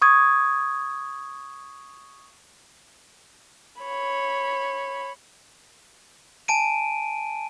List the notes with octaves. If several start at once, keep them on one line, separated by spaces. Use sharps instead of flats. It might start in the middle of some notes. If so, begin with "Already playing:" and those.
C#6 D#6 G#6
C#5 B5
G#5 A5 D7 D#7